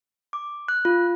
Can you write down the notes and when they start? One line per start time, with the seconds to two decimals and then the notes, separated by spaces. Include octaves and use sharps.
0.33 D6
0.68 F#6
0.85 F4